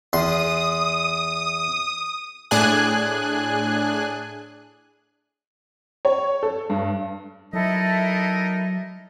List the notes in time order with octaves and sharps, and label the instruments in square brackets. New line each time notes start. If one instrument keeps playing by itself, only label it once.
[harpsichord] E2 C6 [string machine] D#6
[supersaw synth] A2 D4 G#4 G#5 F#6
[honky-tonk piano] C#5
A4
G2
[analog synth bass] F#3 [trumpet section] D#4 A#4 D#5 [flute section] E4 A4 E5